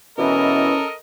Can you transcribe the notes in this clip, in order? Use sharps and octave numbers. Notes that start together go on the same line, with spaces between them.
B2 E3 C#4 A4 A#4 D#5